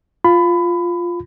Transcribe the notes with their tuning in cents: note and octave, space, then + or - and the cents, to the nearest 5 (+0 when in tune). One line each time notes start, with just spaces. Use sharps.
F4 +0 B5 +20